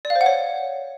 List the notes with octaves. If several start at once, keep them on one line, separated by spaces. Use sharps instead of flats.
D5
F5
C5
F#5
C#5